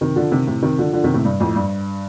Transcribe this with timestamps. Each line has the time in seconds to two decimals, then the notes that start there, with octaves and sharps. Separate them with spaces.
0.01 C3 D#3
0.16 D3 F3
0.32 C3 D#3
0.47 A2 C3
0.62 C3 D#3
0.78 D3 F3
0.93 D3 F3
1.04 C3 D#3
1.14 A2 C3
1.25 G2
1.40 F2 A2
1.56 G2